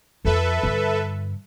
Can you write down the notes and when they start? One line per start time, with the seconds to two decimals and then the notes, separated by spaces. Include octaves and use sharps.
0.25 F2 F3 A4 B4 E5
0.63 G2 D3